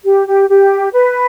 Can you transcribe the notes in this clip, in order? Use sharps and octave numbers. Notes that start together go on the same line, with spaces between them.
G4
G4
G4
B4